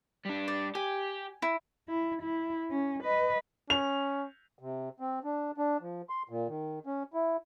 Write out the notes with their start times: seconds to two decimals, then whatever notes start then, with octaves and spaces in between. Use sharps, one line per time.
0.25 G3 D4
0.48 D5
0.75 G4 G#5
1.42 E4
1.89 E4
2.22 E4
2.71 C#4
3.04 B4 D#5
3.70 C#4 F7
4.59 C3
5.00 C4
5.24 D4
5.58 D4
5.81 F3
6.10 C6
6.29 A#2
6.48 D#3
6.86 C#4
7.14 E4